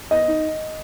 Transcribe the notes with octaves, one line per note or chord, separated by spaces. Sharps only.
B3 D#5
D#4